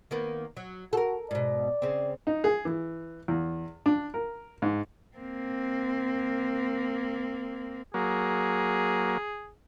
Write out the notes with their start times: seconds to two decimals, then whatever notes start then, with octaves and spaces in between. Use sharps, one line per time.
0.11 D#3 A#3 B3
0.57 F#3
0.93 F#4 A4 A#4
1.31 G#2 B2 D5
1.82 C#3 C4
2.27 D#4
2.44 G#4
2.65 E3
3.28 E2
3.86 D4
4.14 A#4
4.62 G#2
5.17 A#3 C4
7.94 F#3 A#3 G#4